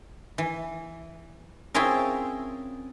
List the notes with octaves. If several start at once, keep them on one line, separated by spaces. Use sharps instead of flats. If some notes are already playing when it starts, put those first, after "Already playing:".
E3
C4 C#4 E4 F4 G#4 A#4